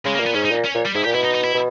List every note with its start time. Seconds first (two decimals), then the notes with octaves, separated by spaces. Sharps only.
0.05 C#3 G#3
0.15 A#3
0.20 A#2
0.26 B3
0.34 G#2 C#4
0.45 D#4
0.50 A#2
0.65 C#4
0.74 A#2
0.85 G3
0.95 G#2 E4
1.04 A#2 G4
1.14 B2 E4
1.24 D#4
1.34 D#4
1.44 E4
1.54 B2